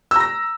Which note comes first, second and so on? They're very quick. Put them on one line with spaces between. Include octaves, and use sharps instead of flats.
E6 A#5 A#6